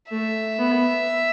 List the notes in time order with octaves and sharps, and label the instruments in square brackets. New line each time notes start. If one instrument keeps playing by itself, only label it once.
[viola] A3 [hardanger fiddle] E5
[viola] B3